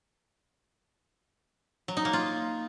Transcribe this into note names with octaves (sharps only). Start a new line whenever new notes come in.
F#3
D#4
A#3
F4